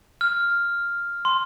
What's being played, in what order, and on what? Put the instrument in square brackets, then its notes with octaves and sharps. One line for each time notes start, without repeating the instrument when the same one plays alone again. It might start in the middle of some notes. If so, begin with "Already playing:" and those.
[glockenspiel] F6
C6